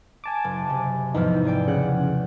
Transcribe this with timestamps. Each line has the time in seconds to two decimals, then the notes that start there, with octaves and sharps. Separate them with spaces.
0.24 G#5 A5 D6
0.44 F#1
0.70 C3
1.15 E2 G#2 F3 D#4
1.45 G#4 D5 G5
1.68 C#3 F#5